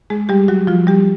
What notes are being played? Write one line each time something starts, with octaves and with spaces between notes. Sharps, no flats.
G#3 G#4
G3 G4
F#3 F#4
F3 F4
G3 G4